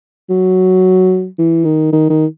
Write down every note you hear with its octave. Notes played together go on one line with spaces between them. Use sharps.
F#3
E3
D#3
D#3
D#3